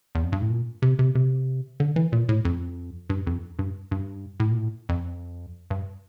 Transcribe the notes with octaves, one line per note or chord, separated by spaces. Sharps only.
E2
F2
G2
A2
A#2
C3
C3
C3
D3
E3
A#2
A2
F2
G2
F2
G2
G2
A2
A#2
A2
F2
G2